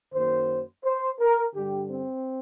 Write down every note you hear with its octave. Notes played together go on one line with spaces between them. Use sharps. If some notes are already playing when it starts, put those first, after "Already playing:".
F#2 D#3 F#3 A#3 C5
C5
A#4
G2 D3 G3 G4
C4